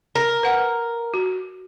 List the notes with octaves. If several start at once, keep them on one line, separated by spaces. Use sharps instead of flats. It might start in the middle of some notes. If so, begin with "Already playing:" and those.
A#4
B4 F#5
F#4